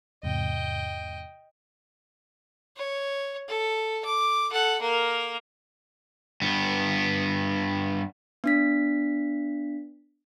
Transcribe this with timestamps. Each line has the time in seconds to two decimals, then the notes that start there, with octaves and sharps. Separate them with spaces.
0.23 E2 G#2 C3 D#5 G5
2.77 C#5
3.48 A4
4.05 D6
4.51 A4 F#5
4.81 A#3 A#4
6.42 G2 B3
8.44 B3 D4 B6